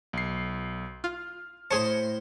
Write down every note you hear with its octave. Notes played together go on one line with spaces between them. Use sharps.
B1 C7
F4 F6
A2 G#4 C5 C#5 A5 C6 C#7